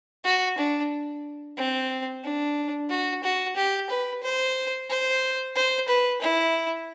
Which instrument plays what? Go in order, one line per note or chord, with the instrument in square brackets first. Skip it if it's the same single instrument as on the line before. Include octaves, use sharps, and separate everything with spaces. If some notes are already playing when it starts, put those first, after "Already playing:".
[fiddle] F#4
D4
C4
D4
F#4
F#4
G4
B4
C5
C5
C5
B4
E4